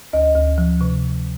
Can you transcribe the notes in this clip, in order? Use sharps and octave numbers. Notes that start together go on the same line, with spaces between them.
D2 D#5
D2
F3
C3